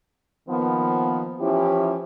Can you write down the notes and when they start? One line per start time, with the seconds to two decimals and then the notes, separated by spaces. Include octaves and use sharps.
0.49 D#3 F3 A#3 B3
1.40 E3 F3 C#4 E4 G4